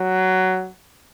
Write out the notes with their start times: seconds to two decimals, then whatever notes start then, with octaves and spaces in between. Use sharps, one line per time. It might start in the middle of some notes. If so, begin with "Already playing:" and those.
Already playing: F#3